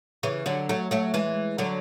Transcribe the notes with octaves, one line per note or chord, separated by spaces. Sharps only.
C#3 E3
D3 F#3
F#3 A3
F#3 A3
E3 G#3
D3 F#3